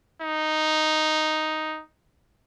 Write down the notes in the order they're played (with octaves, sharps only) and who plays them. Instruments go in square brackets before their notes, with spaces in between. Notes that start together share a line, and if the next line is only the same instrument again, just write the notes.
[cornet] D#4